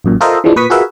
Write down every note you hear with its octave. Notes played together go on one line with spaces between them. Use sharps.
A1 F#2 A#2
F4 A4 A#4 C5 D#5 E5
E3 F3 G#3 D4
A#2 B4 C#6 D#6 B6
F4 F#4 G#4 A#4 B4 E5